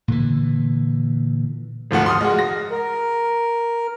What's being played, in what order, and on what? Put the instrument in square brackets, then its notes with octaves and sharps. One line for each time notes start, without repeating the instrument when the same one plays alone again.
[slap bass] A#2 D3 E3
[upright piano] G#1 D2 F3 F#5
C6 D#6 F6
G#3 F#4
A#6
[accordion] A#4